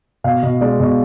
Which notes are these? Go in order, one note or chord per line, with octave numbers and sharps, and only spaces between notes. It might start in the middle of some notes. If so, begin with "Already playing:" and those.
B2 F5
B2 D#5
G#3 D5
B2 D#5